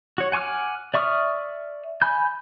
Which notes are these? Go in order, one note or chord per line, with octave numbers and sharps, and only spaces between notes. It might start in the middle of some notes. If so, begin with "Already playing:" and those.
F#4 C#5
F#5 G#5 C#6 D6 F6
D5 E5 C#6 D#6 F6
G#5 B5 G6